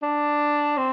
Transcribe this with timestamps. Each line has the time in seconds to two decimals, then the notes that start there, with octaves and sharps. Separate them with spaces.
0.03 D4
0.77 C4